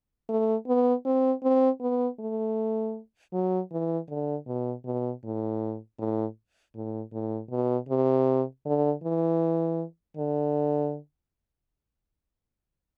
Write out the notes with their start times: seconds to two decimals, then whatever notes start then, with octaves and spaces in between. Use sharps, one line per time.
0.29 A3
0.67 B3
1.05 C4
1.43 C4
1.81 B3
2.19 A3
3.33 F#3
3.72 E3
4.09 D3
4.47 B2
4.85 B2
5.24 A2
5.99 A2
6.75 A2
7.13 A2
7.51 B2
7.89 C3
8.66 D3
9.03 E3
10.17 D3